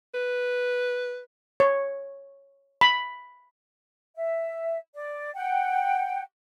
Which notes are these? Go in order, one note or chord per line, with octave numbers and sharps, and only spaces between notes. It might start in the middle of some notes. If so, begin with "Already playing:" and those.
B4
C#5
B5
E5
D5
F#5 G5